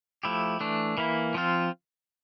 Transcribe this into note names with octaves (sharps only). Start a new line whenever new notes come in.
F3 A3 E4 G4
E3 A3 D4
E3 A#3 E4
F3 C4 F4